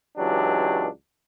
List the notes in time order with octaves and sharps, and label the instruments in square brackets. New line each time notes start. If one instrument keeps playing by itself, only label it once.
[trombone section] C#2 E3 F#3 D4 G4